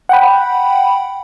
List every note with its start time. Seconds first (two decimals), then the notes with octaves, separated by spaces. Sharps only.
0.09 F#5 G5 B5